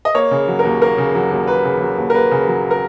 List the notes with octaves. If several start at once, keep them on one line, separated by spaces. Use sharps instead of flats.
D#5
A#3 C#5
C#3
F#3
A#4
D#2
A#3 A#4
C#3
F#3
D#2
A#3 B4
C#3
F#3
D#2
A#4
A#3 B4
C#3
F#3
A#4